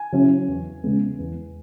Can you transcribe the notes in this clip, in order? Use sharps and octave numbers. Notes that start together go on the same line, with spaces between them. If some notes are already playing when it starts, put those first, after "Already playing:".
Already playing: G#5
C#3 F#3 C#4 E4
E2
C#3 G#3 B3
E2